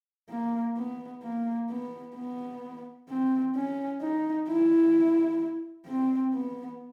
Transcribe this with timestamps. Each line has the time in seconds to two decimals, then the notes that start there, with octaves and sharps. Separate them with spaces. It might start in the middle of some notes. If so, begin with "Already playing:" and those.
0.30 A#3
0.77 B3
1.23 A#3
1.70 B3
2.16 B3
3.09 C4
3.56 C#4
4.01 D#4
4.48 E4
5.87 C4
6.34 B3